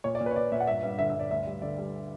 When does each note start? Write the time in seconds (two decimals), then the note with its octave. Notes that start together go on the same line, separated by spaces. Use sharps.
0.04 A#2 C#5
0.15 D5
0.21 A#2
0.26 B4
0.31 C#5
0.36 A#2 D5
0.52 A#2 E5
0.60 F#5
0.67 G2 E5
0.83 G2
0.99 D3 E5
1.10 E5
1.15 G2 D5
1.31 D2 E5
1.47 G3
1.62 D3 D5
1.78 G3